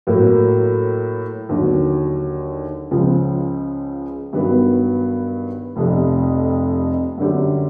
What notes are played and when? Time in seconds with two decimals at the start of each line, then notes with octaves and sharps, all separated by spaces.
0.07 A2 F#3 A#3
1.49 D#2 D3 F#3
2.91 C#2 C#3 F3 G#3
4.33 G2 D#3 F#3 B3
5.76 F1 F2 C3
7.18 F#2 D3 G3